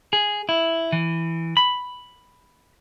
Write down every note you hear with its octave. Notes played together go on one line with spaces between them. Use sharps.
G#4
E4
E3
B5